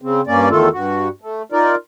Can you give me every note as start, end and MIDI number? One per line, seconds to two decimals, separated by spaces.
0.02 0.21 49
0.02 0.21 60
0.27 0.49 43
0.27 0.49 58
0.27 0.49 61
0.27 0.49 74
0.50 0.69 40
0.50 0.69 51
0.50 0.69 57
0.50 0.69 65
0.50 0.69 69
0.72 1.08 43
0.72 1.08 66
1.22 1.42 57
1.52 1.75 63
1.52 1.75 65
1.52 1.75 70
1.52 1.75 74